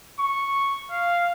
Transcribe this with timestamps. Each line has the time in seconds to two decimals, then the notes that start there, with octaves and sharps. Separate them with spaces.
0.20 C#6
0.91 F5